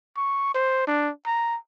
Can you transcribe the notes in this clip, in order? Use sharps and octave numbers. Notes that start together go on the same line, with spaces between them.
C#6
C5
D4
A#5